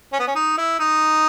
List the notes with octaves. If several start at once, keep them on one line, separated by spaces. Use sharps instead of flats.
C#4
B3
C#4
D#4
E4
D#4